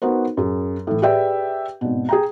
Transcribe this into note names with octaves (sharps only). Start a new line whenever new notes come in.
B3 D#4 F#4 A#4 C5
F#2 G#4
A2 E3
G4 G#4 B4 D5 E5 G5
G#1 B2
G#4 G5 A#5